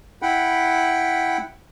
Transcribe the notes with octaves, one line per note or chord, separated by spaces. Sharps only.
E4 F#5 G5 B5